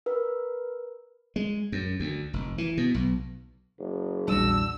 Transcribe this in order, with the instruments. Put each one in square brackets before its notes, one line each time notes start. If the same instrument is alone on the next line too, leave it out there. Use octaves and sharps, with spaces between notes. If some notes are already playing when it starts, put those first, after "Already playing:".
[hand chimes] A#4 B4
[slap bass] G#3
F#2
D2
F1
E3
B2
B1
[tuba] F#1
[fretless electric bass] A#1 E2 G3 [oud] D4 F#4 [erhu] E6